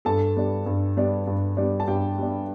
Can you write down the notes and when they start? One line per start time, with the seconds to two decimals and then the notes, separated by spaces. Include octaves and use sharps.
0.05 G2 A4 A5
0.36 G3 B3 D4
0.66 G2
0.97 G3 B3 D4
1.27 G2
1.57 G3 B3 D4
1.80 A5
1.87 G2 G4 G5
2.18 G3 B3 D4